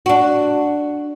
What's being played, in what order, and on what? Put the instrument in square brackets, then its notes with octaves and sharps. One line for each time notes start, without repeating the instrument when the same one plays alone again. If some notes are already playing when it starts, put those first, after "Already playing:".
[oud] D4 F#4